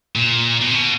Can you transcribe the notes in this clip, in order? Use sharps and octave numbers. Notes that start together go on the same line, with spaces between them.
A#2
B2
C3
B2